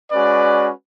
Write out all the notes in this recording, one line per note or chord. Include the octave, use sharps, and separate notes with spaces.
G#3 C#4 F#4 B4 D5